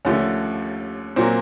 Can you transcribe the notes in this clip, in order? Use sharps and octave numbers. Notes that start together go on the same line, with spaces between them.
D#2 D3 F3 A3 C#4
A#2 F#3 A#3 C4